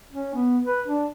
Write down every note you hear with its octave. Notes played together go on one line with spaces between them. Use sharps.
C#4
B3
B4
D4